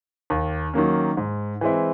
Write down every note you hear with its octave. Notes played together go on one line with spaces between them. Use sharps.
D#2
D#3 F#3 A#3 C#4
G#2
E3 G#3 C4 E4